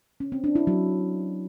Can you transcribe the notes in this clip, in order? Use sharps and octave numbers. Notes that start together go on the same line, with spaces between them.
C#4
C4
D4
E4
F#3